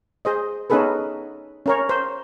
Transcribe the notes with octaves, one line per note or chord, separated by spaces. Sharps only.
G#4 C5 D#5
B3 C#4 D#4 G#4 A4 B4
C#4 A#4 C#5
C5